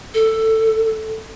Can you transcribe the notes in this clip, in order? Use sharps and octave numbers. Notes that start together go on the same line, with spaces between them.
A4